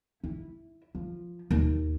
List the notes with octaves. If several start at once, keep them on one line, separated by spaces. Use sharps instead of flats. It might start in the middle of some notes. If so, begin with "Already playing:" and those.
E4
F3
D#2